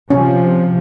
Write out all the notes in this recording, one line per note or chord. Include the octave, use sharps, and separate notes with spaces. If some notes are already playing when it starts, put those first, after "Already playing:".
C3 F3 C#4